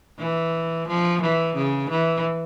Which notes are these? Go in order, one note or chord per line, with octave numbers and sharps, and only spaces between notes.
E3
F3
E3
C#3
E3